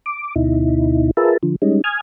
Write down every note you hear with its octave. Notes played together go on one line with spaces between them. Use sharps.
D6
D2 B2 D#4 E4
F4 G#4 A#4 B4 E5 A5
D3 F3
G3 G#3 C#4 D#4
G#5 D#6 F6 G#6